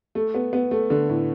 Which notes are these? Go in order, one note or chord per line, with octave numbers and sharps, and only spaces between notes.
A3
B3
B3
A3
D3
A2